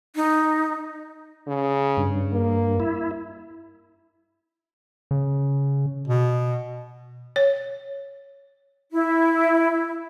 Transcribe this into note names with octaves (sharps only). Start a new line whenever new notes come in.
D#4
C#3
G2
A#3
E4
C#3
B2
C#5
E4